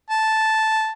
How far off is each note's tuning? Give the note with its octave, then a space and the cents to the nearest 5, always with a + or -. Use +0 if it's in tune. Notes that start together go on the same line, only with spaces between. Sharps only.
A5 -5